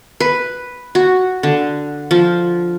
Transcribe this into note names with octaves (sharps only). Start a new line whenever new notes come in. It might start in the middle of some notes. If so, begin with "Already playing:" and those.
B4
F#4
D3
F3